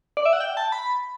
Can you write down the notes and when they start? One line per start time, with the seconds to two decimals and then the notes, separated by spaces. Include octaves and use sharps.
0.17 D5
0.25 E5
0.33 F#5
0.40 G5
0.57 A5
0.72 B5